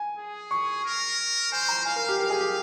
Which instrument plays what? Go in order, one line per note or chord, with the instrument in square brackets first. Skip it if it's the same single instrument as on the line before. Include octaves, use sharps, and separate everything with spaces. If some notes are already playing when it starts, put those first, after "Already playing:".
Already playing: [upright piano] G#5
[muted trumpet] G#4
[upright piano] C#6
[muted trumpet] A#4
[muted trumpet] C5 [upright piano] G#5
[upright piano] A#5
[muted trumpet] F5 [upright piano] G#5
[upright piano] A#4
G4
[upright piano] A#4 [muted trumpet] F5
[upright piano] G#4
G4